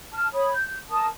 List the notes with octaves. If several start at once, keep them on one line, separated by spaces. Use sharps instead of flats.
A5 F6
C#5 B5 D#6
G6
A#4 A5 D#6